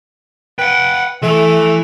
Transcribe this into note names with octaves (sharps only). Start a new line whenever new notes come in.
B4 F#5 G5
E3 A3